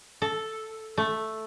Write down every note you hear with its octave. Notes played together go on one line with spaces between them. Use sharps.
A4
A3